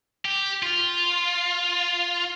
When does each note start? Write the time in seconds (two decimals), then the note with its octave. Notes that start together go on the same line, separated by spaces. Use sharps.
0.25 G4
0.62 F4